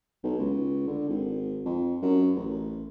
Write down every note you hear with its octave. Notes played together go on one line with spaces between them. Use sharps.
B1
C#2
D3
G#1
F2
F#2
A1